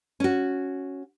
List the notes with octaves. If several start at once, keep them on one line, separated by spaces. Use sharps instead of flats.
C#4 F#4